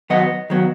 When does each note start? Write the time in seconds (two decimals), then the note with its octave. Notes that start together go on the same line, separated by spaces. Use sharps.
0.10 D#3 F#3 B3 D#5 F#5
0.50 D#3 F#3 B3